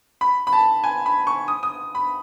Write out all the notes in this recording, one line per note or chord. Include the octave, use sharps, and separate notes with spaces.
B5
B5
A5
G#5
B5
C#6
D#6
D#6
B5